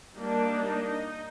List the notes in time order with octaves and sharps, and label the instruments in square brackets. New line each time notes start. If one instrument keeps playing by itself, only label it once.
[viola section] G3 A#3 D4 D#4